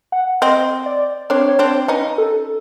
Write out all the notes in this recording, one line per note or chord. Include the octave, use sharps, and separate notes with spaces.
F#5
C4 D#5
D5
C4 D4 C#5
C#5
C4 D4 C5
C#4 D#4 B4
A4